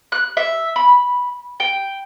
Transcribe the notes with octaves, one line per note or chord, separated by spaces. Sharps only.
F#6
E5
B5
G5